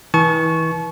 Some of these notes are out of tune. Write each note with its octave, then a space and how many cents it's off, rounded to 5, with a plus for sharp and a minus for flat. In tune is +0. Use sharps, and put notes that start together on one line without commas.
E3 -30 A5 -40 C#6 +0